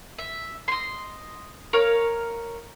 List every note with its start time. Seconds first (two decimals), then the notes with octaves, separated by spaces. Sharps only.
0.18 E5
0.68 D#5 C6
1.73 A#4 C#5 F5